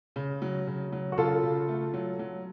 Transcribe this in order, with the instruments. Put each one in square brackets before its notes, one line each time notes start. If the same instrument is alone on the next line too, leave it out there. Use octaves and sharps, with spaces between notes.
[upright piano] C#3
F#3
C#3
F#3
[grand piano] F#4
[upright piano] C#3 [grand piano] F4 A4
[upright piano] C#3
A3
F#3
F#3